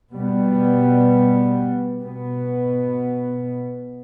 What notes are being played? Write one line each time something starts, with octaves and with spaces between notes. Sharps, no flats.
B2 G3 B3
B2 B3